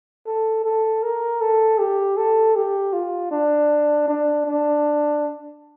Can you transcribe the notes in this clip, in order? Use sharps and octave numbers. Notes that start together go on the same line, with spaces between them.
A4
A4
A#4
A4
G4
A4
G4
F4
D4
D4
D4